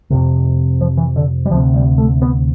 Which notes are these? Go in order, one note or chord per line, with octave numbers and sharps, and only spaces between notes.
F2 C3
F3
E3
D3
G3
D2 C3 F3
G3
A3
B3